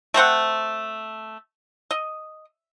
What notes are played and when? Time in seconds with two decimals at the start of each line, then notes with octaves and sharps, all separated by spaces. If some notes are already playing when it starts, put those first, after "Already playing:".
0.14 A3 C4 C5 F#5
1.91 D#5